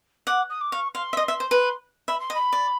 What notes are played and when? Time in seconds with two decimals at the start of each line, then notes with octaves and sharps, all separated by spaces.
0.27 F#5 D6
0.50 D#6
0.61 D6
0.72 F5 C#6
0.95 F5 C6
1.13 E5
1.17 D#5
1.28 E5
1.40 C5
1.51 B4
2.08 E5 B5
2.20 C6
2.30 D#5
2.34 B5
2.53 D5